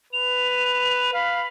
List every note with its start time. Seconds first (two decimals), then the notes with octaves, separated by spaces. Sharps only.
0.13 B4 F7
1.14 F5 B5